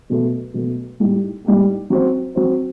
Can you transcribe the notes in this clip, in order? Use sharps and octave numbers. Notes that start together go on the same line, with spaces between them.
B2 F#3 A3
B2 F#3 A3
A2 G3 D#4 G4
A2 G3 D#4 G4
F#3 C4 F#4 C5
F#3 C4 F#4 C5